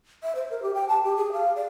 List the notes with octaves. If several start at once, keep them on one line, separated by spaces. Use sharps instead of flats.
E5
C5
A#4
G4
G5
A5
G4
G#4
F5
D5